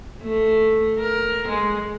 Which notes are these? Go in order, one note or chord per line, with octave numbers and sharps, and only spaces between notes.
A3
A#4
G#3